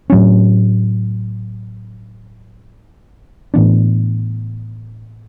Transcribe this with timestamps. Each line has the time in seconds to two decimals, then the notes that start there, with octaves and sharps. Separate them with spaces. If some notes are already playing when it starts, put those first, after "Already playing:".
0.10 A2 F#3 C#4
3.54 A2 E3 B3 D4